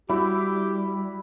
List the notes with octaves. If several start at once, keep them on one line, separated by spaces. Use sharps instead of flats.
G3 E4 F#4 G4 E6